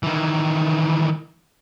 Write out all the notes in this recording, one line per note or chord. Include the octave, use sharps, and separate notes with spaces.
D#3 E3